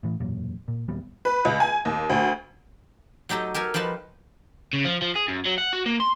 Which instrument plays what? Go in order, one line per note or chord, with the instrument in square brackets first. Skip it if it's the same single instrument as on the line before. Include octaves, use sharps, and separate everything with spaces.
[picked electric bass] A2 E3
E1 F#2 A#2
A#2
D#2 A#2 G3 B3
[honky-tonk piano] B4
C#2
G#5
D#2
D2
[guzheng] F#3 D#4 G4 A4 D#5
G4 A4 A#4 G#5
F3 G3 D#4 B4 A5
[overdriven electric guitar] C#3
F3
F3
G#4
F#2
F#3
F#5
F#4
A#3
C6